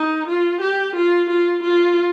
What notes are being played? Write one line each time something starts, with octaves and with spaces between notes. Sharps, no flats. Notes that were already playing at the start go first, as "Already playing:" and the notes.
Already playing: D#4
F4
G4
F4
F4
F4